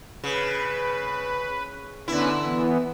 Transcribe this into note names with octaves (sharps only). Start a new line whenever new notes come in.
C#3 B4
D3 B3 C#4 E4 B4
E3 B3